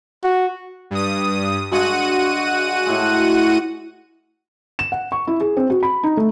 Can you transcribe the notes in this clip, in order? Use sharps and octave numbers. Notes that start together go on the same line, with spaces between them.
F#4
G2 D#6
G2 G#3 F#4 F#5 D#7
A2 G#3
E7
F#5
C#6
E4
G#4
C4
F#4
B5
D#4
A3